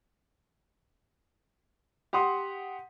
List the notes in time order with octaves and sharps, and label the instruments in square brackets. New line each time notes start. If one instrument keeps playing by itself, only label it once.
[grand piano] G4 F#5 C6 D#6